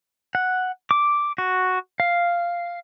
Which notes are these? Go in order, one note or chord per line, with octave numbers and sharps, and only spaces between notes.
F#5
D6
F#4
F5